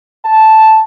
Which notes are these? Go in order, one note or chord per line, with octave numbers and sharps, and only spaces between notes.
A5